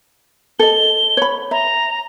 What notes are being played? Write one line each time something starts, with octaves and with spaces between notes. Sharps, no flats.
A4 D#5 G7
C#5 B5
E5 A#5